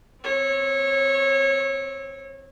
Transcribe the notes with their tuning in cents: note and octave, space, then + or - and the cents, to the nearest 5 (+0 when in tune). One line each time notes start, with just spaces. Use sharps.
C4 +0 C#5 -25